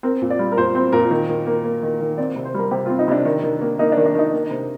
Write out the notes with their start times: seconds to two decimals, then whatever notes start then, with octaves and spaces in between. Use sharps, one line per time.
0.03 C4 A#4
0.22 A#2
0.30 D5
0.39 G3
0.52 A#4
0.58 A#2 C5
0.75 C4 C5
0.93 A#2 A#4
1.11 D#3
1.29 D#3
1.46 A#3
1.64 A#3
1.83 D#3
2.01 D#3
2.18 C4 D5
2.36 C3
2.45 C5
2.54 G3 A#4
2.71 C3 G4
2.86 F4
2.90 C4
2.99 D#4
3.08 C3 D4
3.25 D#3
3.43 D#3
3.61 A#3
3.79 A#3 D#4
3.92 D4
3.97 D#3
4.06 D4
4.15 D#3 D#4
4.32 A#3
4.51 C3